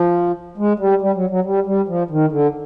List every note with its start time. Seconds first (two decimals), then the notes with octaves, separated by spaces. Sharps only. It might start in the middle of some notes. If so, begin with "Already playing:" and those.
Already playing: F3
0.58 G#3
0.79 G3
1.01 G3
1.16 F#3
1.30 F#3
1.45 G3
1.66 G3
1.88 F3
2.11 D#3
2.32 D3